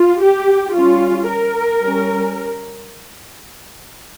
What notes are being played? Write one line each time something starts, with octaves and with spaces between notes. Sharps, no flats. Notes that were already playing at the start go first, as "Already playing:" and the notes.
Already playing: F4
G4
G3 C#4 F4
A#4
G3 C#4